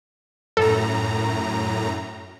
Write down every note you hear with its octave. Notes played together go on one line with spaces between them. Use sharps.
F#2 A2 A4 A#5